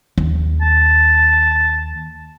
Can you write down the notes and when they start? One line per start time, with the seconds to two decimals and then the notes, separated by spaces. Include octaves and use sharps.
0.18 D#2
0.61 A5